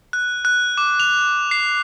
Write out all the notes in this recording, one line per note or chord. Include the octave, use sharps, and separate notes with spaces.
F#6
F#6
D6
F7
C7